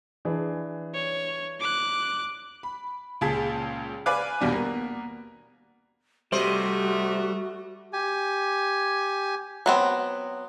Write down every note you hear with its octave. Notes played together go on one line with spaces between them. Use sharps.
E3 D4 G#4
C#5
D6 F#6
B5
C#2 A#2 G#4 A5 B6
B4 D5 F5 G#5 D6 F#6
A#1 D#2 B2 G3 B3 D4
A#3 B3
C3 G3 A3 F#4 C5 D#5
G4 G#5
F#3 B3 C4